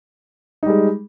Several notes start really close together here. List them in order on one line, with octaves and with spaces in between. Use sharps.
D#4 G3 G#3